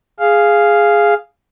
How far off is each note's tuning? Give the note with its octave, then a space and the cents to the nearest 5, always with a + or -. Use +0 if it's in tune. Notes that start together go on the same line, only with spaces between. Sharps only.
G#4 +0 F5 -5